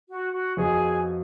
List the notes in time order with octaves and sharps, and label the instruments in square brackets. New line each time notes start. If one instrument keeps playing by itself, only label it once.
[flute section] F#4
F#4
[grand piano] F2 F3 B3 D#4 F#4 [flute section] G#4